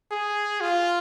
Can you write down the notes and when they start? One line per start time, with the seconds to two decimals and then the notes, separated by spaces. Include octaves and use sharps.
0.11 G#4
0.61 F4